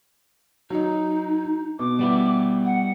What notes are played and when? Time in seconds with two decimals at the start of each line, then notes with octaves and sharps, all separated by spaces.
0.70 F#3 D#4 D#5
1.79 B2 D6
1.99 G3 B3 E4
2.65 F#5